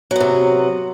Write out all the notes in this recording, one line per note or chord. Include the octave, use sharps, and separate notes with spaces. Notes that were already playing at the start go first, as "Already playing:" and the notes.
C3 F#3 B3